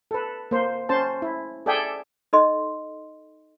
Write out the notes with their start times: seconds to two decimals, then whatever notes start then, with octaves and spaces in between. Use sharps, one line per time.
0.11 A4 B4
0.51 A#3 C5
0.89 C#4 C5 A5
1.22 E4
1.66 G#4 A4 D5 E5 G5 G#5
2.33 D#4 A4 D#5 C6